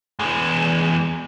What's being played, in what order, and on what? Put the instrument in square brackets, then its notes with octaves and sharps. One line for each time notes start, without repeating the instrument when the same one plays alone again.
[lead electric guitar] E2 G#3